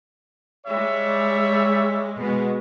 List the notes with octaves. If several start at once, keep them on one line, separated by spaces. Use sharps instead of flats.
G3 G#3 C#5 E5
B2 G#3